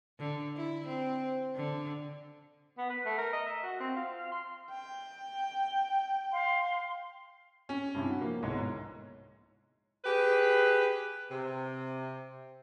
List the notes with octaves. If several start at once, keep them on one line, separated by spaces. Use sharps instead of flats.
D3
E4
C4
D3
B3
B4
A3
A#4
D#5
E5
F#4
C4
F4
F5
C6
G5
F5 C6
C#4
G2 C3 E4
F#4
F3 A#3
G1 C2 G#2 B2 C#5
G4 G#4 B4
C3